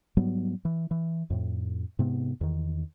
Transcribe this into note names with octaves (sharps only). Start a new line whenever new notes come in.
G#2 F#3 G3 B3
E3
E3
F2 A2
G#2 C3 B3
E2 D#3